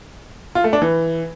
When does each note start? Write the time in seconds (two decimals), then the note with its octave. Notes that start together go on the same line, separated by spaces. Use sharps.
0.55 F4
0.64 A3
0.73 D4
0.82 E3